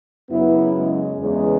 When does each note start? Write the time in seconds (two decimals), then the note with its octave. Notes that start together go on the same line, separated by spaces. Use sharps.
0.30 F#2 C#3 F#3 B3 E4
0.75 G#3
1.20 E2 C#3 E3 G#3